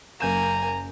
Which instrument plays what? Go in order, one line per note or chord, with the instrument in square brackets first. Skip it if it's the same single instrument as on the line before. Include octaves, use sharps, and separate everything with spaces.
[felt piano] F#1 G6 E7 [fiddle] A#3 G#5 [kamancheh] A#5